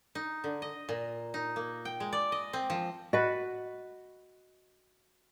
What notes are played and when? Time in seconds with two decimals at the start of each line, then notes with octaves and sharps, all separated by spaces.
0.15 D#4
0.44 D3
0.62 D#5
0.89 A#2
1.34 D#4
1.56 A#3
1.85 G5
2.00 G#3
2.13 D5
2.32 D#5
2.53 C4
2.70 F3
3.13 F#4 B4 D#5